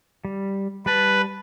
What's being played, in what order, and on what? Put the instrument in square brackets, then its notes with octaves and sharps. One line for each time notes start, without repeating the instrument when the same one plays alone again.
[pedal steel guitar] G3
[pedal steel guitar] G3 A5 [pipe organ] B4